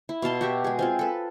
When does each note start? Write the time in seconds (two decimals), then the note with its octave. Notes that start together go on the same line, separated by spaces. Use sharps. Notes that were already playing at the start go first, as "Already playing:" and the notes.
0.09 E4
0.22 B2 F5 A5 C6
0.41 F#4 G4 E5
0.64 G#3 G#4
0.79 C4 F4 G#4
0.99 A4 B4